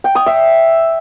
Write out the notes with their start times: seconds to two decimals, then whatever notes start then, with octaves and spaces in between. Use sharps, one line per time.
0.04 G5
0.15 D#6
0.26 E5